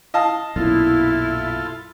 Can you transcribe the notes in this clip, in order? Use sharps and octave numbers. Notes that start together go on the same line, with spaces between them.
D#5 F5 A5
B1 F#2 A#2 E4 F4 A4